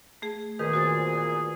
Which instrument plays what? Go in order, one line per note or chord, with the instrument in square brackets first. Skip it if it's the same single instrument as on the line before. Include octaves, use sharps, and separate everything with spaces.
[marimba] A3 G#4
[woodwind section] E2 A#2 G#4 [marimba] D#3 B4
[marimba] F#4 C5 A6